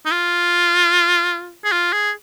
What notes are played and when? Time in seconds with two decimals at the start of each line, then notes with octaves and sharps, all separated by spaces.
0.06 D#4
0.11 F4
1.64 G#4
1.72 F4
1.93 G#4